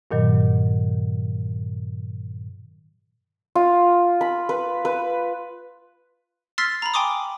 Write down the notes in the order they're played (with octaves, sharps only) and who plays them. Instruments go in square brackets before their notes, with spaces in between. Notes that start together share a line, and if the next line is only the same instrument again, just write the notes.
[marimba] G2 A#2 D#3 F#3
[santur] F4
B5
B4
B4
[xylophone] C6 E6 F6 A6 B6 C7
A#5 B5
G5 G#5 C6 D6 D#6